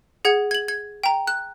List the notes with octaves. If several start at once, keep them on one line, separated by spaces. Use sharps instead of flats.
G#4 F#5 G#6
G#6 F#7
G#6
G5 A#5
F#6